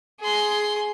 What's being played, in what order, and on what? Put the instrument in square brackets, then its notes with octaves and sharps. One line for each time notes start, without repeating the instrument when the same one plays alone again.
[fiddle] G#4 C6